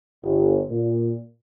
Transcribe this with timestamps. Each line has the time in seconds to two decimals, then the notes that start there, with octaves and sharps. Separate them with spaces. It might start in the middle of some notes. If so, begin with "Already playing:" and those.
0.24 G1
0.70 A#2